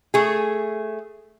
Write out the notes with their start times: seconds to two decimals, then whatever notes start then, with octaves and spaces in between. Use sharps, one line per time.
0.14 A3 G#4